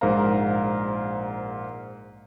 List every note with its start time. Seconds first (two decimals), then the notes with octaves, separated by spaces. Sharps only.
0.01 A#1 G#2 A#4 C5 F5 A#5